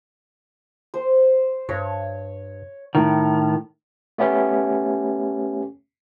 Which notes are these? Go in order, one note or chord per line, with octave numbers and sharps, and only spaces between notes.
C5
G2 C#5
A2 D#3
A3 B3 C#4 G4